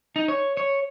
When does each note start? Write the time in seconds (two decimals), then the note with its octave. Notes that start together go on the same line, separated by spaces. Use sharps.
0.16 D#4
0.28 C#5
0.57 C#5